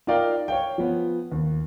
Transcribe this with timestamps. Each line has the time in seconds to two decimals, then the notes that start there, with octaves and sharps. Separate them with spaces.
0.07 D#4 F4 A#4 D5 F5 G5
0.48 C#5 F5 G5
0.78 F3 B3
1.32 D#2